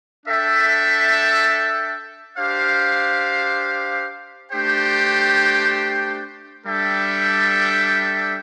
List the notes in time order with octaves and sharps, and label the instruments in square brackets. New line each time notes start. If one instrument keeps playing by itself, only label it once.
[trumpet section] D4 A4 E5 G5
D4 G4 C5 F5
A3 D4 G4 C5 G5
G3 D4 A4 E5 G5